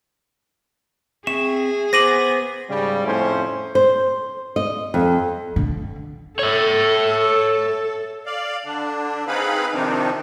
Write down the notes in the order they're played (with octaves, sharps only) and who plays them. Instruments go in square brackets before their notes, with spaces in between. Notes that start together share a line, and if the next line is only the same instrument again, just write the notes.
[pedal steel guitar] C4 E5 C#6 [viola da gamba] G#4 [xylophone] E7
[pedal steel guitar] B3 [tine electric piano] C5 D6 [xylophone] A#6 D#7 F#7
[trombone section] G#2 C#3 G3
F2 A2 C#4 C5
[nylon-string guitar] C5
D#5
F2
[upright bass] D3
[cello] A4 [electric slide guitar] C#5 E5
[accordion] D5 F5
D3 D4
C4 D#4 G#4 B4 F5 B5
C3 D#3 F3 C4 D4 D#4